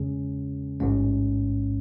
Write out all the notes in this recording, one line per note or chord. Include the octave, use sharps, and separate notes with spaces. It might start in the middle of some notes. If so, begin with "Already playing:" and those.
Already playing: E2 C#3 G#3 C#4 G#4
A1 G#2 G#3 C#4